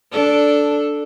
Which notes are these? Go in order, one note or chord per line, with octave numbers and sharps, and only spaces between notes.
D4 A4